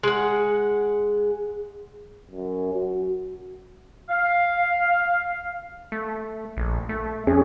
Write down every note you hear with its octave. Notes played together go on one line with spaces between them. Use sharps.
G#3 F#5
F#2
F#4
F5
A3
A#1
A3
F2 C#4 G#4